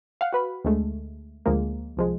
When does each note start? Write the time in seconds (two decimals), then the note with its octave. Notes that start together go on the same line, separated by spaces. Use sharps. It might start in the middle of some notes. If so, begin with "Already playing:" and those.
0.21 F5 F#5
0.32 F#4 B4 B5
0.65 D2 G#3 A3
1.46 D2 F3 G#3 A#3
1.97 C2 F3 G#3